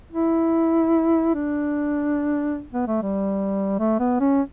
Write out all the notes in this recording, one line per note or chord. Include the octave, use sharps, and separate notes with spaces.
E4
D4
B3
A3
G3
A3
B3
C#4